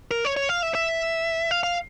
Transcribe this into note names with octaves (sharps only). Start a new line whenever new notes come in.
A#4
C#5
C#5
F5
E5
E5
F5
F5